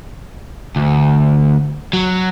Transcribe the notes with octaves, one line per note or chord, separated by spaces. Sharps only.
D2
F#3